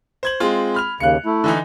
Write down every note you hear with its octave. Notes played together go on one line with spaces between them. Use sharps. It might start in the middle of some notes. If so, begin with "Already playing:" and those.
C5 G#6 F#7
G#3 C4 F4
B5 F6 F7
D#2 C#3 F#6 C#7
A3 E4
D3 E3 D#4